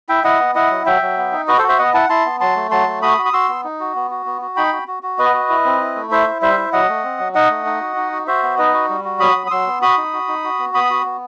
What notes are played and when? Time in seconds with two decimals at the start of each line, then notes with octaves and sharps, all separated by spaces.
0.09 E4 E5 G5
0.24 E4 D#5 F#5
0.40 B3
0.55 E4 D#5 F#5
0.70 F#3
0.86 F#3 E5 G5
1.02 F#3
1.17 B3
1.32 D#4
1.48 F#4 B4 D#5
1.58 A4 C5
1.63 F#4
1.68 C5 E5
1.78 B3 D#5 F#5
1.94 E4 F#5 A5
2.09 E4 A5 C6
2.25 B3
2.40 F#3 A5 C6
2.56 A3
2.71 F#3 A5 C6
2.87 A3
3.02 F#4 B5 D#6
3.18 F#4
3.26 D#6
3.33 F#4 C6 E6
3.49 B3
3.64 D#4
3.80 F#4
3.95 B3
4.11 F#4
4.26 B3
4.42 F#4
4.56 D#4 G5 B5
4.72 F#4
4.88 F#4
5.03 F#4
5.18 B3 B4 D#5
5.34 F#4
5.49 E4
5.65 C4
5.81 E4
5.95 A3
6.11 E4 C5 E5
6.27 E4
6.42 G3 C5 E5
6.57 E4
6.73 F#3 D#5 F#5
6.88 A3
7.04 C4
7.19 F#3
7.35 D#4 D#5 F#5
7.50 A3
7.66 D#4
7.81 F#4
7.96 D#4
8.12 F#4
8.27 F#4 C5 E5
8.43 B3
8.58 D#4 B4 D#5
8.74 F#4
8.89 G3
9.04 F#4
9.20 F#3 B5 D#6
9.35 F#3
9.47 D#6
9.51 F#3 C6 E6
9.66 B3
9.82 F#4 B5 D#6
9.97 D#4
10.13 F#4
10.28 D#4
10.44 F#4
10.59 B3
10.74 B3 B5 D#6
10.90 F#4
11.05 B3